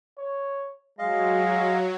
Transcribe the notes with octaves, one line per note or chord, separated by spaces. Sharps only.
C#5
F#3 G#3 D#5 F5